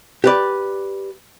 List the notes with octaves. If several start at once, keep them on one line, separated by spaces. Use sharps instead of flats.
G4 B4 D5